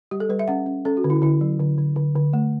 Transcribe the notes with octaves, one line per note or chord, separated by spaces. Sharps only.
G3 G4
A4
G3 B4
E5
C#4 F#5
C#4
C#4 A4
F#4
D3
E4
D3 E4
F#3
D3
D3
D3
D3
A3